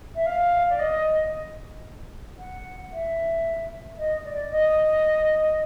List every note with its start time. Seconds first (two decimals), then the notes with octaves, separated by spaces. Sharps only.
0.15 E5
0.26 F5
0.70 D5
0.79 D#5
2.39 F#5
2.92 E5
3.98 D#5
4.24 D5
4.51 D#5